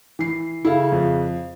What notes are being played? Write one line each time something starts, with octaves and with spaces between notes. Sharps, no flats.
E3 C7
C#3 E4 A4 F5
F2